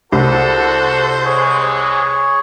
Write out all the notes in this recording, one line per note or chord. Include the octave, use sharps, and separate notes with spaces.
C2 F#4 A4 C5
E3 G#3 G#4 C#5